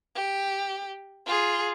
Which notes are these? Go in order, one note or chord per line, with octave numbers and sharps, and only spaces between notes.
G4
F4 G#4